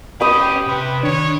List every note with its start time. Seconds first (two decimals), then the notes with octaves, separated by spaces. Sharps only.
0.21 C#4 G4 B4 B5 D#6
0.67 C3 B4 G5 C6
1.03 C#2 D#3 D4 C#5